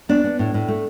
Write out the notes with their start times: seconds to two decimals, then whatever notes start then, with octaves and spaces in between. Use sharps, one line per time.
0.09 B3 D4
0.24 B3
0.39 A2
0.54 A2
0.68 A3